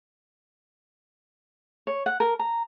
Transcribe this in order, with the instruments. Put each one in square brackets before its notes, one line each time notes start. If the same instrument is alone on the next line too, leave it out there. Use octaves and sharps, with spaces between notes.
[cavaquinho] C#5
F#5
A#4
A#5